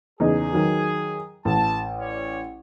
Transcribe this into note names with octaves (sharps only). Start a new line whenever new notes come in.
E2 C#3 D#4 G#4
D#3 F#3
A1 A5
C#4 C#5 D5